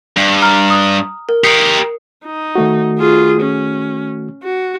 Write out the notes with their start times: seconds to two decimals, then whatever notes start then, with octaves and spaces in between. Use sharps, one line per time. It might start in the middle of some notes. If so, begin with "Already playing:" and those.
0.17 G2
0.42 A#5 F6
0.70 D#6
1.29 A#4
1.44 G4 A#4 D#6 C7 C#7
2.25 D#4
2.55 D#3 A3 F#4
2.99 F4 G#4
3.41 C#4
4.44 F#4